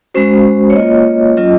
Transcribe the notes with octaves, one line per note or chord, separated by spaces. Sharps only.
G#3 C#4 F#4 C5
C#5
A#3 F4 D#5
F#3 C#4 F4 D#5